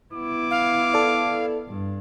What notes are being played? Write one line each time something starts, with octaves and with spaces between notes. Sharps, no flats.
B3 E4 D6
F5
A4 D5
G2